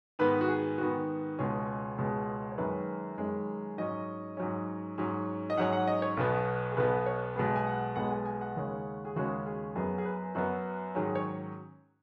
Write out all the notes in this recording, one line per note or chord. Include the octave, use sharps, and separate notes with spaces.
G#2 D#3 B3 B4
F#4
G#4
G#2 D#3 B3 F#4
C#2 B2 G#3 C#4 G#4
C#2 B2 G#3 C#4
C#5
F#2 D#3 G#3 C#4 B4
F#2 D#3 G#3 C#4
G#2 F#3 C#4 D#5
G#2 F#3 C#4
G#2 F#3 C#4
D#5
G#2 F#3 C#4 F#5
F#5
D#5
C#5
B1 B2 B3
G#4
B1 B2 B3 B4
C#5
B1 B2 G#3 B3 G#4
G#5
F#5
B1 B2 G#3 B3 F#5
G#5
G#5
F#5
D#2 C#3 G#3 C#4
G#4
D#2 C#3 G#3 C#4 F#4
G#4
F#2 F#3 B3 G#4
G#4
B4
F#2 F#3 B3 F#4
G#2 D#3 F#3 C#4 G#4
C#5